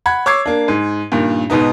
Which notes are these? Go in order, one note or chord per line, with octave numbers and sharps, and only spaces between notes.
F#5 B5 G#6
C#5 D6 E6 G#6 C7
A#3 D4
G#2
G2 A#2 D#3
G#2 B2 B3 D#4